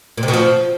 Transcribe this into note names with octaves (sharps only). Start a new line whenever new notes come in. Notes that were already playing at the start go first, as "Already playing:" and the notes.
A#2
C3
B2
F3